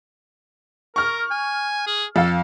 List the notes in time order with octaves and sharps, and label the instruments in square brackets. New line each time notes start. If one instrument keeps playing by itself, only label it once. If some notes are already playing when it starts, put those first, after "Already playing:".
[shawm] A#4 [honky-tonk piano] C#6 F6
[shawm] G#5
G#4
[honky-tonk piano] F2 F5 [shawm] A4